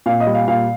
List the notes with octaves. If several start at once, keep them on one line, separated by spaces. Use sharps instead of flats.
A#2 F5
D#5
G3
F5
A#2 F5